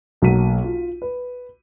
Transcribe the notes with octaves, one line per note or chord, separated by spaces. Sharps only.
B1 F#3 A#3 B6 D#7
F4
B4